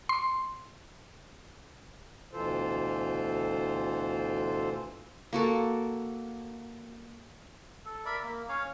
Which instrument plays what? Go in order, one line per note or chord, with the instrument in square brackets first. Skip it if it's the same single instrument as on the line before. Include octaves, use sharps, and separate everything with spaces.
[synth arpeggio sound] C6
[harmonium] D2 B2 E3 F4 A4 C5
[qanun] A#3 F#4 A4
[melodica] A4
A#4 D5 E5 B5
A#3
C#4 C#5 F5